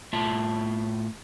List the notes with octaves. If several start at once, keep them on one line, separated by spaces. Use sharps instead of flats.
A2 F4 E5 A5